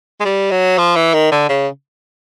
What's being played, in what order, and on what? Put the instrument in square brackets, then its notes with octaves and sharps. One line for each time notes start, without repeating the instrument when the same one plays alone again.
[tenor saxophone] G#3
G3
F#3
F3
E3
D#3
D3
C#3